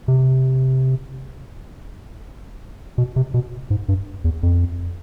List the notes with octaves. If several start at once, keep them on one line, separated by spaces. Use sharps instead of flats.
C3
B2
C3
B2
G#2
G2
E2
F2